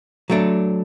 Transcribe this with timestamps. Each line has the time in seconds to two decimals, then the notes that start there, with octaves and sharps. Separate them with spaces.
0.30 F#3 A3 D4